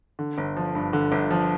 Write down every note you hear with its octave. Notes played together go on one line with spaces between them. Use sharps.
D3
G1
F3
G2
D3
G1
F3